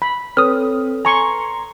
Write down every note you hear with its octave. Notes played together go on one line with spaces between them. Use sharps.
B5
C4 A4 B4 C#5 D#6 F6
G#5 A#5 C6 C#6